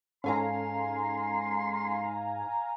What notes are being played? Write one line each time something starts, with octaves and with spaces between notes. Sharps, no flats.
G#2 C#4 A4 F5 G#5 A#5 C6